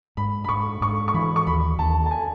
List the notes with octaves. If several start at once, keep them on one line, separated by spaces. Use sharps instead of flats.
G#2 B5
B5
G#2 C#6
G#2 C#6
C#6
E3 B5
C#6
D#2 B5
D#2 A5
A5
G#5